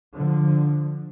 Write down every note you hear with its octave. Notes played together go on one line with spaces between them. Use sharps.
D3 F3